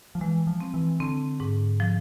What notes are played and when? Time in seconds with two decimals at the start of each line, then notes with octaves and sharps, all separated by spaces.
0.15 F3
0.21 E3 G#3
0.47 F3
0.60 C4
0.74 E3
1.00 D3 C4
1.40 G#2
1.80 F3